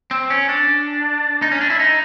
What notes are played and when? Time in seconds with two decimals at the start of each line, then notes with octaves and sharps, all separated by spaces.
0.11 C4
0.30 C#4
0.49 D4
1.42 D#4
1.51 C#4
1.61 D4
1.70 E4
1.79 D#4